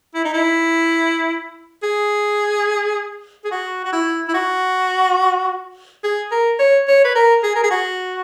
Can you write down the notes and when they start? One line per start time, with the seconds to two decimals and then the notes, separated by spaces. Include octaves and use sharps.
0.15 E4
0.25 D#4
0.33 E4
1.83 G#4
3.44 G#4
3.51 F#4
3.85 F#4
3.93 E4
4.28 E4
4.34 F#4
6.04 G#4
6.31 A#4
6.59 C#5
6.88 C#5
7.05 B4
7.15 A#4
7.43 G#4
7.55 A#4
7.63 G#4
7.71 F#4